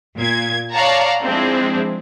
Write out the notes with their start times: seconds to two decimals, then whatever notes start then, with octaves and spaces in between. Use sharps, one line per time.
0.16 A#2 G#6
0.72 C#5 D5 F5 F#5 A5 A#5
1.24 F3 G#3 C4 D4 E4